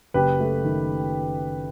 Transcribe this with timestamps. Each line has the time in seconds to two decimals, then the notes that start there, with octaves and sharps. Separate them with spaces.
0.14 F#1 G4 B4
0.40 A3
0.64 D#3